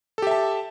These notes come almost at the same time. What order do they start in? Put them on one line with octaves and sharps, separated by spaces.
A4 G4 E5 A5